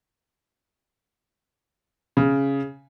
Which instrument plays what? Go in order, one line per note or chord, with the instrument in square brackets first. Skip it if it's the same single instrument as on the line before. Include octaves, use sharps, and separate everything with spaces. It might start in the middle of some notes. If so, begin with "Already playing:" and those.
[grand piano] C#3